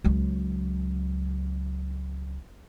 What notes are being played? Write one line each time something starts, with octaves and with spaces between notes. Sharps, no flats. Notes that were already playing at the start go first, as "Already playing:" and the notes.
C#2 F#3